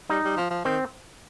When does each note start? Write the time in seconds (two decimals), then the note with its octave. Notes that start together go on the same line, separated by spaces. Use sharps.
0.10 G3 D#4
0.24 G3
0.37 F3
0.50 F3
0.64 D#3 C4